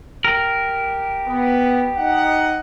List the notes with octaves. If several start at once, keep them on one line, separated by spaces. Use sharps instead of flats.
G4 A#4
B3
D#4 D#5 F#5